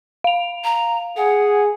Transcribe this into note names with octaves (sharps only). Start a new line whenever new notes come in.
F5 F7
A#5
G#4 F#5